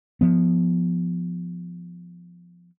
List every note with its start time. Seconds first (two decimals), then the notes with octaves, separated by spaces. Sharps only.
0.21 F3 B3